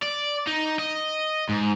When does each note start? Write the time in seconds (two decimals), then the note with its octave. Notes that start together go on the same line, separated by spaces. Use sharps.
0.03 D5
0.47 D#4
0.79 D#5
1.49 G#2